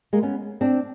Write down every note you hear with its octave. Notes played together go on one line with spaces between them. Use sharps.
G#3 A#3
B3 C#4
C4 D4